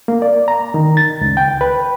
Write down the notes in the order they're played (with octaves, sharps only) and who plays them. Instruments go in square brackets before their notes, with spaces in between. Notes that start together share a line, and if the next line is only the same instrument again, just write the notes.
[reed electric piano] A#3
D5
A#5
D#3
A6
C#2
G5
B4